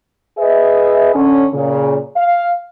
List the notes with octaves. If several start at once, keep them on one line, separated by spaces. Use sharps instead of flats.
G#4 B4 D#5 E5
D3 C#4
A#2 C#3
F5